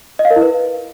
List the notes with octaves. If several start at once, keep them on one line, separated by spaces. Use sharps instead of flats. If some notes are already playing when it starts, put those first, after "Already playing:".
D#5
F5
A#4
E4
B4